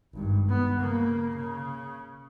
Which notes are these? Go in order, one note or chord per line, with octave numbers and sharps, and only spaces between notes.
G#1 G2
B3
C#3 A#3
C#3